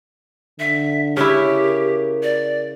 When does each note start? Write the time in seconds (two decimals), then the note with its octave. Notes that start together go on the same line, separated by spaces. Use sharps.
0.59 D3 E5
1.17 C#3 E4 G4
1.55 A#4
2.23 D5